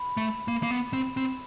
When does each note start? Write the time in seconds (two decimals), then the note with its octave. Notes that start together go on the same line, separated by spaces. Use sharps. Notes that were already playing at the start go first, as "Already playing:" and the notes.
Already playing: B5
0.17 A3
0.48 A#3
0.63 A#3
0.71 B3
0.93 C4
1.17 C4